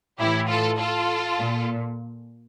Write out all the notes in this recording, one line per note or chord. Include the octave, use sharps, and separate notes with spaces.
A2 E3 E4 G4
F4 A4
F4 A4
A#2